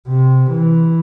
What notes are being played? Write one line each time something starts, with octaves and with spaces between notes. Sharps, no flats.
C3
E3